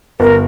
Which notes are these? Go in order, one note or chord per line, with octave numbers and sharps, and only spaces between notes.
G1 A#4